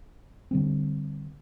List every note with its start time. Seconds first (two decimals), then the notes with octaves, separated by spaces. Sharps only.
0.51 D3 G3 C4